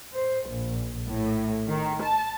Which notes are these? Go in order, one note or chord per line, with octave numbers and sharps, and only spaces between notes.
C5
A#1
A2
D#3
A5